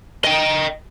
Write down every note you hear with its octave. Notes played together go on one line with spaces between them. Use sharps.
D#5 G5